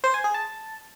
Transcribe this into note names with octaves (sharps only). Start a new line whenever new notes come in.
C5
G#5
G#4
A5